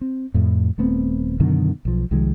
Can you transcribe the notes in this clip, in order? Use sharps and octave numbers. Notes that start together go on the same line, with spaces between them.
C4
F2 A2
D#1 A3 B3 C4
F#2 B2 D3 D#3
B1 F3
C2 D#3 F3 G#3